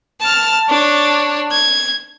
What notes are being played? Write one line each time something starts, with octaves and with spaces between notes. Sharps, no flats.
A5 F6
D4 C#5
G#6